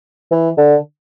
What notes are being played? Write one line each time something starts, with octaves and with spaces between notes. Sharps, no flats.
E3
D3